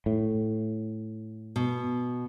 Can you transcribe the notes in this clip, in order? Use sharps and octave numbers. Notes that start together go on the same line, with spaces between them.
A2
B2